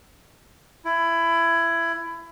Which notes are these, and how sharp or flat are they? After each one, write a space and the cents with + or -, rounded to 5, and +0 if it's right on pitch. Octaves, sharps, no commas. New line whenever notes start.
E4 +20